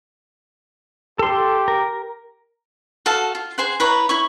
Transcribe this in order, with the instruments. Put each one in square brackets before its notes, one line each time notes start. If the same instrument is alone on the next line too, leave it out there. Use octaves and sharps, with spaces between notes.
[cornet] G4 [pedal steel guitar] A4 C6
[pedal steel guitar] A#4
[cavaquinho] F#4 A4 F5 A5
F4
G#4 C5 F#5
E4 B4 C#5 A#5
E4 C#5 C#6